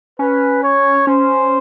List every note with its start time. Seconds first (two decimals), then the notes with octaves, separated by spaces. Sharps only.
0.19 C#4 B4
0.63 C#5
1.07 C#4 C5